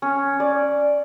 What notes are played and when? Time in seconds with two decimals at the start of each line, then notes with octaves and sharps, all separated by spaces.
0.02 C#4
0.40 D5